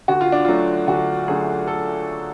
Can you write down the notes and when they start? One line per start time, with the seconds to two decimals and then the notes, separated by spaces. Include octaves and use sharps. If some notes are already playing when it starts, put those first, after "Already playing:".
0.08 D2 F#4
0.21 F4
0.32 D4
0.45 D3 F#3 A3 F4
0.87 D2 F#4
1.28 D3 F#3 A3 G#4
1.68 A4